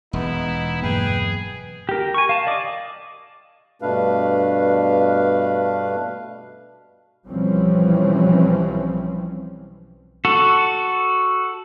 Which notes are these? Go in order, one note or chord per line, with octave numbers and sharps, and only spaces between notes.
E1 B3 D#4 E4
G2 F#3 A#3 G#4 B4 G5
G4 A#4
G#5 C#6
F5 A5
D5 D#5 D6
G2 B2 A3 D4 B4 F5
B1 E3 F3 G3 C4 C#4
F#4 A4